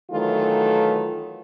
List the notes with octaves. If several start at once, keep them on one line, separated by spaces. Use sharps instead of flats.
D#3 E3 F#3 A3 F4